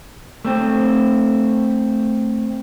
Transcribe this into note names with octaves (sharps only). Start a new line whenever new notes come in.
A3 C4